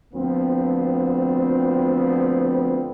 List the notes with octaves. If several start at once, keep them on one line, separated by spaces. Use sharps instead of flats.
D2 F3 B3 C4